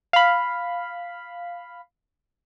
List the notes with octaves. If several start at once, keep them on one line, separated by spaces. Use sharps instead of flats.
F5 B5